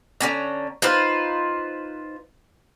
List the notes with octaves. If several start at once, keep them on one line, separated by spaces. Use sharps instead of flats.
D3 C#4 A#5
D#4 F4 B4 C5